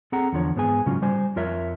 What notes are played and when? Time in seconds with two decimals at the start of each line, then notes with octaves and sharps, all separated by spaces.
0.12 C4 G#4 A4 F#5 A#5
0.33 E2 D3 F3 C#5
0.56 G#2 B3 G#4 G#5
0.86 G#2 C#3 F#3 C#4 F4
1.02 G3 C5 G#5
1.36 F2 F4 A#4 C#5 E5